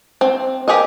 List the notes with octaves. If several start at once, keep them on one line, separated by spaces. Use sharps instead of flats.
C4
G4 G#4 A#4 D#5